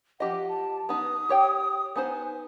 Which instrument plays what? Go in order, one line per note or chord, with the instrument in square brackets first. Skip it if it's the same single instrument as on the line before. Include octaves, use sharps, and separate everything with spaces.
[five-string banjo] F3 G4 D#5 [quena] F#5
[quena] A5
[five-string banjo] B3 D#4 [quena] D#6
[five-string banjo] G4 C#5 G5
[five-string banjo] B3 D#4 C5 [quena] G#5